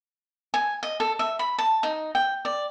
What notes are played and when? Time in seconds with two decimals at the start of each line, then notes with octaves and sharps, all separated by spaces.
0.54 G#5
0.83 D#5
1.00 A4
1.19 E5
1.39 B5
1.58 A5
1.83 D#4
2.15 G5
2.45 D5